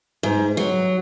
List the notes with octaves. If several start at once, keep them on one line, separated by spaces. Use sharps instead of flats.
G#2
F#3